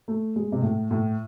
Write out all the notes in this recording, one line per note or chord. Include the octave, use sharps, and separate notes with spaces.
A3
G#3
C3
A2
A2